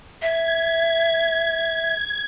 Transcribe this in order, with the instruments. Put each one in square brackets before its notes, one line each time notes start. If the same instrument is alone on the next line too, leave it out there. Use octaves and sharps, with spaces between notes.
[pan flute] E5 [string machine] G#6